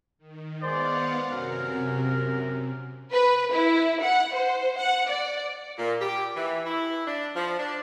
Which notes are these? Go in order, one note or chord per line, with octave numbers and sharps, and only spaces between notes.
D#3
G#3 B3 C5 D5 F5 F#5
F#2 C3 A#4
B4
E4
F#5
C5
F#5
D5
A#2
G4
E3
E4
D4
F3
D4